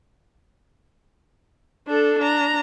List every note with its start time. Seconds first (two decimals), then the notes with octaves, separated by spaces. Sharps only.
1.88 D4 A4
2.19 D4 A#5